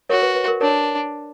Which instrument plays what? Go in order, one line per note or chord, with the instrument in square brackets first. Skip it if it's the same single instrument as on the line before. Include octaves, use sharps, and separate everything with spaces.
[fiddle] F#4 [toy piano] A#4 C#5
[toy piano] B4
B4
A#4
[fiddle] D4 [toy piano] A#4 C#5